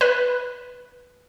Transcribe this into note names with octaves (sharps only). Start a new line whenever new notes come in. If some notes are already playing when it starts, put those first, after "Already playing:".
B4